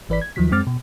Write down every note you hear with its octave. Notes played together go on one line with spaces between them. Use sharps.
G#1 E3 B4 D5 B6
G#6
D#2 D#3 F3 F#3 B6
F#2 G#3 C4 D6 F6 A6
B2